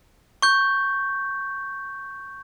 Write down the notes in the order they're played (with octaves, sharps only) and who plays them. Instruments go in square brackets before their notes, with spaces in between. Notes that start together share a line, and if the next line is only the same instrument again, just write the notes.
[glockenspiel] C#6 G6